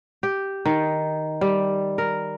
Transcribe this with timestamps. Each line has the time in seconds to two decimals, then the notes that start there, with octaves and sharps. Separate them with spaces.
0.23 G4
0.66 D#3
1.41 G3
1.98 A#4